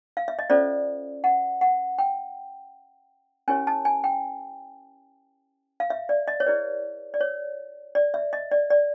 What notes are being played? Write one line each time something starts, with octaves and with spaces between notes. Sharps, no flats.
F5
E5
D#5
C#4 F4 A4 C5 D5
F#5
F#5
G5
C#4 E4 G4 A#4 C#5 G#5
A5
G#5
G5
F5
E5
D5
D#5
C#5
E4 G#4 B4 D5
D5
C#5
D5
E5
D#5
D5
D5